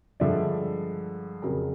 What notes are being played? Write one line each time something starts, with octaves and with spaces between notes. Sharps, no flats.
G2 D3 F3 G#3 D5 E5
F2 C#3 F#3 A#4